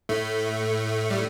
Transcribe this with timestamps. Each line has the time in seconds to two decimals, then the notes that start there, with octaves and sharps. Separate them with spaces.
0.09 A2 A3
1.10 G3